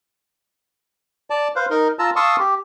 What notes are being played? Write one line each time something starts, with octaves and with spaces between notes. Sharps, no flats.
D5 A5
B4 C5 F5
D#4 A#4
F4 A5 A#5 E6
F5 A5 C6 C#6 D#6 E6
G4